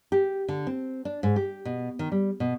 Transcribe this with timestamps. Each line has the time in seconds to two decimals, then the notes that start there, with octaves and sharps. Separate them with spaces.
0.12 G4
0.48 D3
0.67 C4
1.05 D4
1.23 G#2
1.36 G4
1.65 B2
1.99 D#3
2.12 G3
2.40 B2